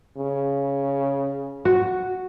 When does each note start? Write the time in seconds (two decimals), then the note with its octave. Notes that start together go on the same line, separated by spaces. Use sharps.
0.17 C#3
1.65 F#4